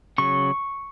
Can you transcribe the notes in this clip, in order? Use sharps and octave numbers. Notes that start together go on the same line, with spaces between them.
C#3 F#3 C#6